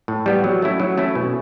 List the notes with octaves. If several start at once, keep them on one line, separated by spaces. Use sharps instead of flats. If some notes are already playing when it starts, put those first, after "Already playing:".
A2
G3 B3
F#3
A3 C#4 E4
F#3
A3 C#4 E4
B2